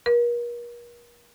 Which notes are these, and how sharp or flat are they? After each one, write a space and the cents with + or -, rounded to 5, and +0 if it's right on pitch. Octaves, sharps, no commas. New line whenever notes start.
A#4 +40